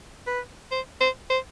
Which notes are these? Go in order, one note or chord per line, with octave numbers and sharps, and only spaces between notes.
B4
C5
C5
C5